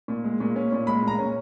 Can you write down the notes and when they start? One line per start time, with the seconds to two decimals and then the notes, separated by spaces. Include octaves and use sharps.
0.08 A#2
0.24 G#3
0.40 A#2
0.56 C#4
0.72 A#2
0.87 G#3 B5
1.02 A#2
1.08 A#5
1.19 C#4